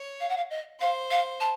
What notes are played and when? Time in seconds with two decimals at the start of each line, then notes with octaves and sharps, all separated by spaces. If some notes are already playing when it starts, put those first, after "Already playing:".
Already playing: C#5
0.20 F5
0.29 F#5
0.37 F5
0.50 D#5
0.80 C5 F5
1.11 F5
1.40 A5